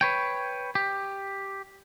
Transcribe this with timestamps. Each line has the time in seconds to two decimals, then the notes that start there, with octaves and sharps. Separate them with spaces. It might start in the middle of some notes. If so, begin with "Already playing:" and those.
0.01 B4 C#5 G5
0.75 G4